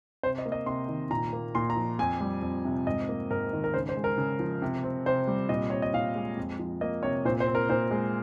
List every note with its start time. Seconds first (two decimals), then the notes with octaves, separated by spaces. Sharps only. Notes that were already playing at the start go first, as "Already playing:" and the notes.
0.23 C3 C5
0.38 D#5
0.45 A#3
0.52 D#5
0.66 C3 C6
0.88 D#3
1.10 A#2 A#5
1.33 A#3
1.55 A#2 C6
1.70 A#5
1.76 F3
1.99 F2 G#5
2.21 G3
2.42 F2
2.65 C3
2.86 G#2 D#5
3.08 A#3
3.30 G#2 A#4
3.53 D#3
3.64 A#4
3.74 C#3 C5
3.89 C5
3.97 G#3
4.04 A#4
4.18 C#3
4.39 F3
4.62 C3
4.83 C4
5.06 C3 C5
5.27 G3
5.49 A#2 D#5
5.70 C4 C#5
5.82 D#5
5.93 A#2 F5
6.15 G#3
6.37 F2
6.59 F3
6.81 A#3 D#5
7.03 C3 C#5
7.25 A#2 C5
7.40 C5
7.47 C4
7.55 A#4
7.69 A#2 C5
7.91 G#3